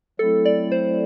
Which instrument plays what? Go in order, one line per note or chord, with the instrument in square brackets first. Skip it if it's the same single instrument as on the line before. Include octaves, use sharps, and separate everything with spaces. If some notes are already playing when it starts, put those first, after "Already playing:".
[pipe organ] F#3 A3 C4 E4 [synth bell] A4
[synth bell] D5
C5